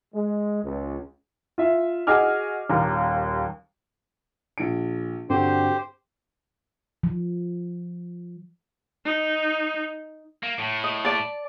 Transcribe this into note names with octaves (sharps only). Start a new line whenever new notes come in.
G#3
C#2
F4 E5
F#4 G#4 D#5 G#5 D6 F6
D#1 D#2 A#5
A#1 D7
G2 D3 C4 F#4 G4 C5
F3
D#4
A#3
A2
D#5
D5 A5